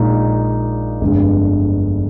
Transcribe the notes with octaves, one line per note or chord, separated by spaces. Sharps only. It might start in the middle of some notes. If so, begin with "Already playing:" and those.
Already playing: A#1 A#2 G#3 D#4
G1 F2 D3 G#3